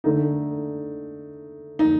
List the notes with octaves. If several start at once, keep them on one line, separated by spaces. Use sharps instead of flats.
D3 A3 D#4
D#4